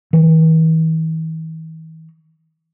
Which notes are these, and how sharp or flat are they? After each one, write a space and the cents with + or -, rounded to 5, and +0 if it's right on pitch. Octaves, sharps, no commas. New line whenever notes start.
E3 -45